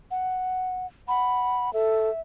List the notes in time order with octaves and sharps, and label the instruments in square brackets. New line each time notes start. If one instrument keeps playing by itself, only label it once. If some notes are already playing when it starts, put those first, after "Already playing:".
[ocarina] F#5
[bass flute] F#5 [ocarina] B5
[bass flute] A4 [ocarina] E5